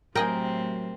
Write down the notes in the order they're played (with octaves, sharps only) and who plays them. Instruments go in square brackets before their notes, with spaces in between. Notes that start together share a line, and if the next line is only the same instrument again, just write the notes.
[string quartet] A2 C3 C4 [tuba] F#3 [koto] G#4 D#5 G5 [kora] A#4